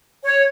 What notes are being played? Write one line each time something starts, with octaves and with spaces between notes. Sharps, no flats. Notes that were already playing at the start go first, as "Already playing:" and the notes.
C#5